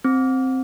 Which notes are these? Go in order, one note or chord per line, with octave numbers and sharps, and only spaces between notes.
C4